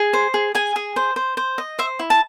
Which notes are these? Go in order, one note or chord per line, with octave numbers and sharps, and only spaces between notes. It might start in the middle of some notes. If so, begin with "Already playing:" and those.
Already playing: G#4
C5
G#4
G#4 G#5
G#4
C5
C5
C5
D#5
C5 E5
E4
A5